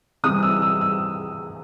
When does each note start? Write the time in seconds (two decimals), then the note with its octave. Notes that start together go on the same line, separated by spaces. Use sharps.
0.23 C3 E3 G3 D#6
0.43 E6
0.62 E6
0.81 E6